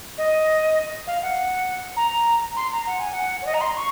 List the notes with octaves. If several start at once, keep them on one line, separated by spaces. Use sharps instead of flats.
D#5
F5
F#5
A#5
C6
A#5
F#5
G#5
F#5
C#5
D#5
A#5
C6
C#6